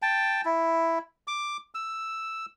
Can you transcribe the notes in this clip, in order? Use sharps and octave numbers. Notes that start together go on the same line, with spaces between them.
G5 A5
E4
D6
E6